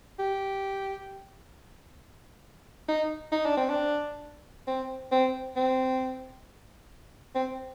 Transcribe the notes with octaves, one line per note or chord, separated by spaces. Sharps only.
G4
D#4
D#4
D4
C4
D4
C4
C4
C4
C4